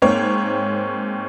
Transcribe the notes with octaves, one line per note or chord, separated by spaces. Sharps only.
G#2 A#3 C4 C#5